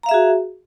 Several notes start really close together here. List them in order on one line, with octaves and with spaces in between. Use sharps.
A#5 F5 E5 G#4 F#4